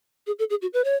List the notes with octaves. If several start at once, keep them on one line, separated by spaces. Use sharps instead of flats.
G#4
A4
G#4
F#4
B4
C#5